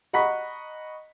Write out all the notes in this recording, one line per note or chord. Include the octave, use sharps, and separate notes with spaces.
D#5 F#5 A#5 B5 C#6 B6